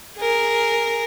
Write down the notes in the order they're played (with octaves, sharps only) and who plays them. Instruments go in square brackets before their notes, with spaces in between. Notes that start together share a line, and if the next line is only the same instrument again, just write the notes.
[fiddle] G#4 A#4